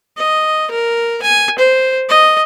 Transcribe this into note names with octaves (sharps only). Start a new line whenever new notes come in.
D#5
A#4
G#5
C5
D#5